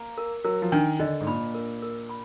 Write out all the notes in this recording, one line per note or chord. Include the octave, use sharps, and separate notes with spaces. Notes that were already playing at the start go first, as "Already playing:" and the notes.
Already playing: A#3
A#4
F#3 A#4
F3
D#3 D4
D3 D#5
G#2
A#2 B5
A#4
A#4
B5